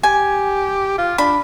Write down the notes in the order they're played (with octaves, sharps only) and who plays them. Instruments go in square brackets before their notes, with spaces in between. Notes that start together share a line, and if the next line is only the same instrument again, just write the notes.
[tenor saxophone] G4 [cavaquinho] G#5
[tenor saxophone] F4
[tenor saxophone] D4 [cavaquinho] B5